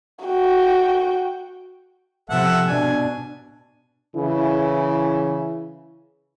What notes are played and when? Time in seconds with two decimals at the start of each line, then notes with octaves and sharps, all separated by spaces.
0.25 F#4 G5
2.30 C3 F3 A4 E5 F#5
2.67 B2 D4 G#5
4.17 C#3 E3 E4